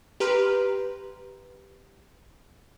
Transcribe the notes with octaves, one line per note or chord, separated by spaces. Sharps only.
G4 B4 A#5 C6 F6